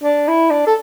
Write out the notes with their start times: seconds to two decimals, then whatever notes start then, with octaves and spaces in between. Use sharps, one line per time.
0.04 D4
0.28 E4
0.51 D4
0.67 A4